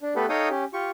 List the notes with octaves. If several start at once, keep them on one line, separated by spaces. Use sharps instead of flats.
D4
A3 B3 G4 A4 B4
D#4 A4 C#5 F5 G5 D#6
C#4 G4
F4 G4 C#6